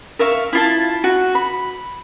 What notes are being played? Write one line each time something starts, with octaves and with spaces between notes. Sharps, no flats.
A#4 E5 F5 C#6
E4 F4 A5
F#4
B5